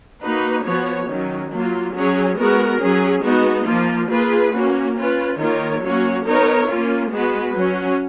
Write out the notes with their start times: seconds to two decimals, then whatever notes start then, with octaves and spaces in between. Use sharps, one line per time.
0.21 A#3 D#4 F#4 B4
0.64 F3 B3 F#4 C#5
1.08 D#3 F#3 C#4
1.51 F#3 A#3 F4
1.93 F#3 C#4 G#4 C#5
2.36 G#3 B3 F#4 A#4
2.79 F#3 C#4 G#4
3.23 G#3 B3 D#4 F#4
3.66 F3 A#3 F4
4.09 A#3 F4 G#4 B4
4.52 A#3 C#4 F#4
4.95 C#4 F4 B4
5.38 D#3 A#3 F4 A#4 C#5
5.82 F#3 A#3 C#4 F#4 C#5
6.24 B3 D#4 A#4 C#5
6.67 A#3 C#4 F4
7.11 G#3 B3 F#4 B4
7.53 F#3 C#4 F#4